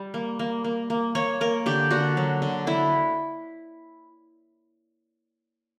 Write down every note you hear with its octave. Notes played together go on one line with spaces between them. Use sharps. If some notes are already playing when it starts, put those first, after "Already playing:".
Already playing: G3
A#3
A#3
A#3
A#3
A#3 C#5
A#3 A#4
D3 G4
D3 F#4
F#3
D3
D3 E4